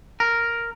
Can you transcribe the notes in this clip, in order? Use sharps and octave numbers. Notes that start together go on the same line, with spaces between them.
A#4